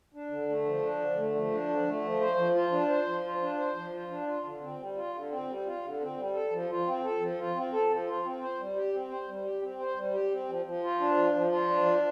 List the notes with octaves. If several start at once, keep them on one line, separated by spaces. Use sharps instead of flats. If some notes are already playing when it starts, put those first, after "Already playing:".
D4
D3
A3
F3
D4
D3
A3
F3
D4
D3
A3
F3
C5
F3
F4
D4
C5
F3
F4
D4
C5
F3
F4
D4
F4
D3
C4
G3
F4
D3
C4
G3
F4
D3
C4
G3
A4
F3
F4
C4
A4
F3
F4
C4
A4
F3
F4
C4
C5
G3
G4
C4
C5
G3
G4
C4
C5
G3
G4
C4
F3
F3
F4
D4
F3
F3
F4
D4
F3